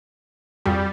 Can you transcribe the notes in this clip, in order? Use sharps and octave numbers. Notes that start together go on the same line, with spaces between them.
F2 G3 F#4 G#4